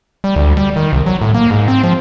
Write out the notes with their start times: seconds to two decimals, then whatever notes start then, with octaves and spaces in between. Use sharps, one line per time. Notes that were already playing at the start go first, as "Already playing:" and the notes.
0.24 G3
0.36 D2
0.57 G3
0.76 D#3
0.93 C2
1.06 F#3
1.21 A2
1.35 A#3
1.50 G#2
1.68 C4
1.84 F3